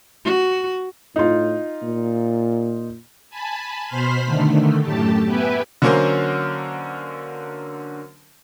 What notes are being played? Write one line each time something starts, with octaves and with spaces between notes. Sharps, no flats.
F#4
A2 D#4 F4
A#2
G#5 A5 B5
B2 C5 B5 C6 F6 B6
D3 D#3 A3
F#2 A2 A3 G4 A5
B3 G4 B4 E5 G5 G#5
D3 F#3 A#3 C#4 A#4 C5